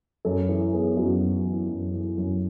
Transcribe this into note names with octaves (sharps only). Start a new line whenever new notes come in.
F#2 A4
E3 A4
B3 G#4
F#2 F#4
F#2
E3
F#2
E3
F#2